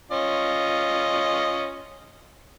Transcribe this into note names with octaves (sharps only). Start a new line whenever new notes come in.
C#4 F4 D#5